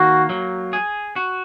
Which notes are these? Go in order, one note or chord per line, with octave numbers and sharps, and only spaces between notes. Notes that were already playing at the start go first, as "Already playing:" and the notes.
Already playing: D#3 A#3 F#4
F#3
G#4
F#4